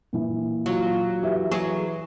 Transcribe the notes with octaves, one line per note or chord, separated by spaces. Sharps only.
A#2 E3
F#3 F4
E3 G4 E5
F#3 G#4 C#6